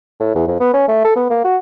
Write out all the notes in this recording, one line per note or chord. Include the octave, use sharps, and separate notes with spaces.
A2
E2
F2
B3
C#4
A3
A4
B3
A#3
F#4